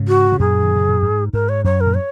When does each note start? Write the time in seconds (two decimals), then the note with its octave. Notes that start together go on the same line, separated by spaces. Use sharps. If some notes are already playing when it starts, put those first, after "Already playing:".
Already playing: G#2 C#3
0.08 F#4
0.32 C#3
0.40 F#2 A#2 G#4
0.63 D#3
0.76 C#3
0.89 A#2
1.03 G#2
1.33 G#2 A#4
1.49 C#5
1.64 F#2 C#5
1.81 A#4
1.86 A#2
1.96 C#5